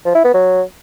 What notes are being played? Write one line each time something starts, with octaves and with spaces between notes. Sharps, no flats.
F3
E4
B3
F#3